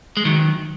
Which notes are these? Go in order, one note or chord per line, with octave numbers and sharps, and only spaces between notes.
G#3
D#3 F#3